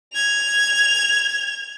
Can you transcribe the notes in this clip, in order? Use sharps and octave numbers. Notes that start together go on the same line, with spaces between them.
G#6 F7